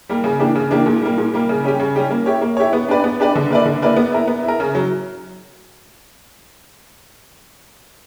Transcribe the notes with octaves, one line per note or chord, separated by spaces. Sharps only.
G3 A#3
C#3
E3 A#3 D4 G4
C#3
E3 A#3 D4 G4
A#2
G3 A#3
A#2
G3 A#3
C#3
G3 C#4 G4
C#3
G3 C#4 G4
A#3
E4 G4 C#5
A#3
E4 G4 C#5
B3
D4 G4 B4 D5
B3
D4 G4 B4 D5
D3
A#3 E4 B4 D5
D3
A#3 E4 B4 D5
B3
E4 A#4
B3
E4
A#4
C#3
F#3